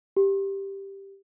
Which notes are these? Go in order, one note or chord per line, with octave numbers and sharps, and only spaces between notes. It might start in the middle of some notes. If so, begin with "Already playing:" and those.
G4